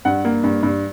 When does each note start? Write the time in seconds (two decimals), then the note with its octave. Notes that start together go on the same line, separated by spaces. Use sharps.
0.05 G2 F#5
0.25 A#3
0.44 G2
0.63 G2